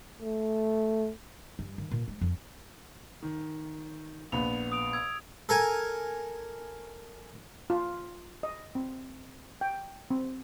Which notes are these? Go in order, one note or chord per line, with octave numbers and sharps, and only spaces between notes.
A3
G2
D#3
A#2
G#3
F2
D#3
A#1 B3 B5 F7
D#6 D7 F7
E6 G#6
A4 A#4 G#5
F4
D#5
C4
G5
C4